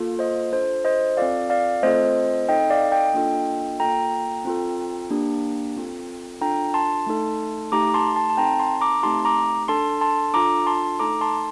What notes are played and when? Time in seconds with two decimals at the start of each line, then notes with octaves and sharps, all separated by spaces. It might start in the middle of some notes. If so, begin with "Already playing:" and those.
Already playing: A#3 F4 A4
0.19 C5 D#5
0.52 D4 F4 A4 C5
0.85 C5 D#5
1.17 C4 F4 A4 D5 F5
1.50 D5 F5
1.83 A3 C4 F4 A4 C5 D#5
2.49 C4 D#4 A4 D#5 G5
2.70 D5 F5
2.92 D#5 G5
3.13 A#3 D4 F4 A4
3.80 A#3 F4 A4 G5 A#5
4.45 C4 F4 A4
5.10 A#3 D4 G4
5.76 C4 F4 A4
6.41 D4 F4 A4 G5 A#5
6.74 A5 C6
7.07 A3 D#4 A4
7.72 A3 D#4 G4 A#5 D6
7.94 A5 C6
8.16 A5 C6
8.30 A5
8.37 C4 D#4 A4 G5 A#5
8.59 A5 C6
8.81 A#5 D6
9.03 A3 C4 D#4 G4 A5 C6
9.25 A#5 D6
9.68 D4 A4 A5 C6
10.01 A5 C6
10.34 D4 F4 A4 A#5 D6
10.67 A5 C6
11.00 A3 D#4 A4 A#5 D6
11.21 A5 C6